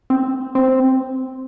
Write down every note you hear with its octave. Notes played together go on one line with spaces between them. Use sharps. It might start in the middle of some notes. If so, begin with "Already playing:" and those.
C4
C4